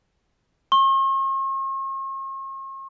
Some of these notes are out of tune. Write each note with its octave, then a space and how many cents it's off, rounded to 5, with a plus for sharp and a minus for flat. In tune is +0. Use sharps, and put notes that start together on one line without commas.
C#6 -45